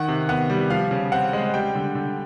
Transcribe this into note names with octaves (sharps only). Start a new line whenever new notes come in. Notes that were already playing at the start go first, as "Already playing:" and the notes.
Already playing: D#3 F#5
C3
B3 F#5
G3
F3 F5
C#3
C4 F#5
G#3
G3 G5
D3
D3